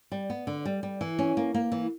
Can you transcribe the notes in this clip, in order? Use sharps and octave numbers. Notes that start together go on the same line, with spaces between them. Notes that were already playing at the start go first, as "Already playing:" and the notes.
G3
B3
D3
G3
G3
E3
C#4
A#3
A#3
E3